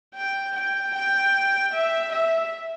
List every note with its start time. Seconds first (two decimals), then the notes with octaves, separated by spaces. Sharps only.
0.15 G5
0.55 G5
0.94 G5
1.73 E5
2.12 E5